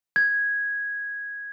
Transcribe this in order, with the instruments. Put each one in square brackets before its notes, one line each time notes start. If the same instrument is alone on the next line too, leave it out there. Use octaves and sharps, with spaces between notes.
[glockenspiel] G#6